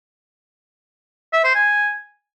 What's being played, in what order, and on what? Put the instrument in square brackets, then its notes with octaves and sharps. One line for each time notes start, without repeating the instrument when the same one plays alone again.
[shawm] E5
C5
G#5